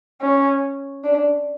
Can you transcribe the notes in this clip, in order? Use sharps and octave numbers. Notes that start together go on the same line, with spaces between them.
C#4
D4